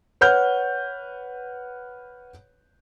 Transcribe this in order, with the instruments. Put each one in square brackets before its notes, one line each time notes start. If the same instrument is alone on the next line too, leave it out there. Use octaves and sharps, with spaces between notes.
[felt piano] B4 C#5 F#5 F6 G6